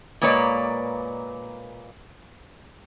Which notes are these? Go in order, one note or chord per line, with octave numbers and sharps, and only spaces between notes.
A#2 G#3 A#3 B4 C#5 D5